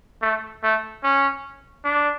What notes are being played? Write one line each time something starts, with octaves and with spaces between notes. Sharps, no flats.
A3
A3
C#4
D4